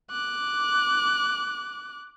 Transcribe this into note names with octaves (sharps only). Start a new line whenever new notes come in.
D6 F#6